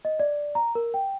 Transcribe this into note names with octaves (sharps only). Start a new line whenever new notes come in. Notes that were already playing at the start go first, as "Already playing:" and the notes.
D#5
D5
A#5
A#4
G5